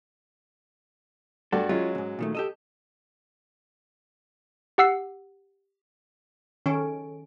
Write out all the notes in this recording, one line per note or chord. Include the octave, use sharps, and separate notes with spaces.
G2 F#4 A4 D5
F#3 G#3 C#4 F4
D2 G#2
A#2 D#3 A3
G4 A4 D#5
G4 F#5 E6 C7
D#3 C#4 A4 D7